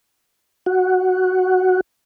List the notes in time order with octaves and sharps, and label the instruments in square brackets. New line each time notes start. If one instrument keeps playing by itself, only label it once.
[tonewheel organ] F#4